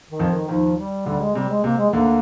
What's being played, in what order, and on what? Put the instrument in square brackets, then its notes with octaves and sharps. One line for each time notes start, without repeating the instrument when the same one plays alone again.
[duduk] D#3
[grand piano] F2 F3
[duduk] D#3
[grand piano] D#2 D#3 [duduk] F3
[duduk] G3
[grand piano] D2 D3 [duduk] G3
[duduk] G#3
[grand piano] C3 [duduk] G3
[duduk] G#3
[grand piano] C3 [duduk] A#3
[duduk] G#3
[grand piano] D2 D3 [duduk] A#3